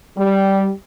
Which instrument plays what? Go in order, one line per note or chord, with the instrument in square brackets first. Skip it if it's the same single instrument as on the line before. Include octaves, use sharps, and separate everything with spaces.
[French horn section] G3